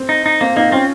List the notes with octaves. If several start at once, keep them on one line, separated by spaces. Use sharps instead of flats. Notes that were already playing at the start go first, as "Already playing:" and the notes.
Already playing: C4
D#4
D#4
A#3 C4
A#3 C4 D#4
C4 C#4 F4